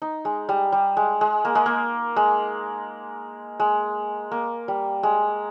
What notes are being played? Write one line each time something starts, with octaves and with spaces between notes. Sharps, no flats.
D#4
G#3
G3
G3
G#3
G#3
A#3
G#3
A#3
G#3
G#3
A#3
G3
G#3